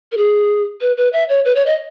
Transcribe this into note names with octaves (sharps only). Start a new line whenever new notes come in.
A#4
G#4
B4
B4
E5
C#5
B4
C#5
D#5